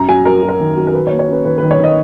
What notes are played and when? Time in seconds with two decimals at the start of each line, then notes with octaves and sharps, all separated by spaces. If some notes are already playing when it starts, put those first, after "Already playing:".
Already playing: F#2 A#5
0.09 F#3 G#5
0.25 F#3 A#4
0.43 F#3
0.49 A#4
0.60 D#3
0.77 F#3
0.87 A#4
0.94 D#3 B4
1.07 C#5
1.11 A#3
1.19 C#5
1.28 C#4 B4
1.45 D#3 B4
1.58 D#3 B4
1.71 C#5
1.79 D#3 D#5